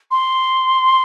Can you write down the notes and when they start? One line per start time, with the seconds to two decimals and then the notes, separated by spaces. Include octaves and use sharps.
0.11 C6